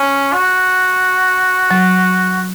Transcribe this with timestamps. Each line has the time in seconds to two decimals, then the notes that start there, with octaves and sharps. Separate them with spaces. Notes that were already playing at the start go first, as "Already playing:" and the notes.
Already playing: C#4
0.33 F#4
1.71 F#3